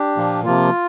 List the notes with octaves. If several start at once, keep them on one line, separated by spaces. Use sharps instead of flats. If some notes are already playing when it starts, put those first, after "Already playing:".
Already playing: D4 G4
A#2 F3 A#3
C3 F3 A#3 F4